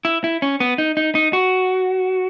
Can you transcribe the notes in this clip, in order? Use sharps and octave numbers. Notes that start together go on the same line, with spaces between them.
E4
E4
C#4
B3
D#4
D#4
D#4
F#4